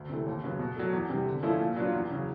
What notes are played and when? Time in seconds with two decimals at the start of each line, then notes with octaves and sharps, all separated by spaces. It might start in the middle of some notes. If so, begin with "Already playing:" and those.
Already playing: D2
0.10 C3 E3 A3
0.26 D#2
0.43 C#3 F#3 B3
0.59 B2
0.76 F#3 A3
0.93 E2
1.09 C3 E3 G3
1.26 D3
1.43 F3 A3 C#4 E4
1.60 A#2
1.76 F#3 B3 D4 F4
1.93 E2
2.10 C#3 F#3